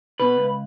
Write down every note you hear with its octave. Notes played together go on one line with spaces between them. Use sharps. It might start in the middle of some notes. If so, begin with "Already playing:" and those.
B2 B4
C#2